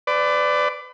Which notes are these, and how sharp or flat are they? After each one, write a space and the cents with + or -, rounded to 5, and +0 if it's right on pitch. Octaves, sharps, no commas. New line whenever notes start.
B4 +35 D5 +0